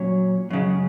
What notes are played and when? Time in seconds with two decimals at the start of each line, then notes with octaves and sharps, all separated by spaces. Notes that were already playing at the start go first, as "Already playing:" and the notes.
Already playing: A#2 F#3 C#4
0.50 F#2 C#3 G#3